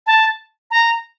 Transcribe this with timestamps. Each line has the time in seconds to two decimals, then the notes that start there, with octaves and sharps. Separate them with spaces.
0.07 A5
0.71 A#5